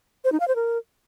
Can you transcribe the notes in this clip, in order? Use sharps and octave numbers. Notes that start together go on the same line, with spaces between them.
C5
D#4
F5
C5
A#4